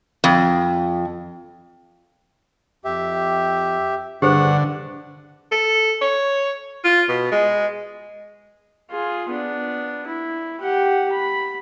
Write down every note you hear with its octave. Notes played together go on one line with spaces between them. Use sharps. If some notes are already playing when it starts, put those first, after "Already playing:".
F2
F2 G4 E5
G2 D3 G4 G#4 C5 F#5
A4
C#5
F4
B2
G#3
F4 G#4
B3 D4
E4
G4 F#5
B5